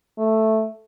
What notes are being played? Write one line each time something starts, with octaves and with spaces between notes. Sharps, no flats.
A3